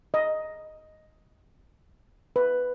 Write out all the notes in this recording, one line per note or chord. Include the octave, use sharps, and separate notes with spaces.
D#5
B4